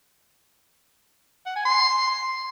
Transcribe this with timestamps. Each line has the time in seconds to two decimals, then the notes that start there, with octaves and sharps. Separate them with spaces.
1.46 F#5
1.56 G#5
1.65 C6